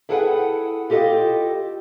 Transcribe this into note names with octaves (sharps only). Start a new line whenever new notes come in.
E4 G#4 A4 B4 F#5 G5
F4 G4 A4 D5 D#5 G5